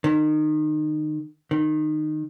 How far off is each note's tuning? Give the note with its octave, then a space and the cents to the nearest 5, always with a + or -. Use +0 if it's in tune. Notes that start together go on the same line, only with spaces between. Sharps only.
D#3 -25
D#3 -20